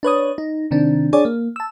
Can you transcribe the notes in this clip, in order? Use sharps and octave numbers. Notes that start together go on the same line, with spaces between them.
D4 B4 C#5 D#6
D#4
C3 D#3 C4 D4
D4 G#4 C#5 D5
A#3
A5 E6